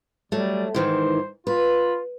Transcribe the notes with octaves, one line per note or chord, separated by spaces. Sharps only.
F#3 G3 A3
G#2 D#3 E3 C5
F4 B4